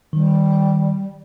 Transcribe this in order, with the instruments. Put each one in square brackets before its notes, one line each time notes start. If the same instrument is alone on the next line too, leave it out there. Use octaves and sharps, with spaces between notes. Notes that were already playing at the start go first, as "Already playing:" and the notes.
[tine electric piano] D#3 [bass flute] G3